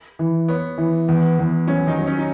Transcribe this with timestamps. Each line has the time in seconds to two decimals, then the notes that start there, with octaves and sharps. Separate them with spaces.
0.19 E3
0.48 B3 C#5
0.78 E3
1.08 E2
1.39 E2
1.67 F#3 C#4
1.87 D#3 D#4
1.98 F#3
2.07 C#4
2.19 D#4